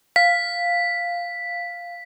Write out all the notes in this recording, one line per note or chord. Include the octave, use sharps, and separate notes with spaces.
F5 B6